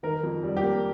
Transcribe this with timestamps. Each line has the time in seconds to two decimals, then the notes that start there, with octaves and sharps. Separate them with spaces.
0.03 D#3 A#4
0.23 F2
0.43 G3
0.57 G4
0.63 A#3